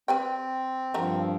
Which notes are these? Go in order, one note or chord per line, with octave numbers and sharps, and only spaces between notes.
C4 B4 D5 G5
G2 D3 F3 A#4